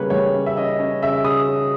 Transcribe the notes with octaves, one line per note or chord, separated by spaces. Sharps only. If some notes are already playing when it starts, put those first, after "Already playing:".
Already playing: C#3 G3 A#3 C#4 B4 C#5
G3 C#5
C#4
E5
C#4 D#5
C#4
C#3 E5
C#3 D#6
C#4